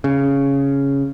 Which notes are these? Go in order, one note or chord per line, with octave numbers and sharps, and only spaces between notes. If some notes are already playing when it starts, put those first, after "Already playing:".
C#3